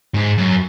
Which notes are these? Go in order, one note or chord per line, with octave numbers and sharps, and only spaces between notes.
G#2
F#2